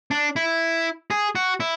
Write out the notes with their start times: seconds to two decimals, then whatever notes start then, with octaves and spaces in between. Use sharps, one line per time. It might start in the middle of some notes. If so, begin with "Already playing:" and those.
0.11 D4
0.36 E4
1.11 G#4
1.35 F#4
1.60 E4